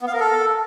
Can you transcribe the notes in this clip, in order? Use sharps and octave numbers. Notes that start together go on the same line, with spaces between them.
B3
F5
A#4
A4